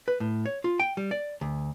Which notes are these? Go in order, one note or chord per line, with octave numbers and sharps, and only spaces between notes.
B4
A2
C#5
F4
G5
G3
D5
D2